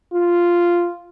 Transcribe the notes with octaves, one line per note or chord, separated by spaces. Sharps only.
F4